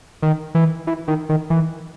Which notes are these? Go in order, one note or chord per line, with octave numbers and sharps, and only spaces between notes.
D#3
E3
E3
D#3
D#3
E3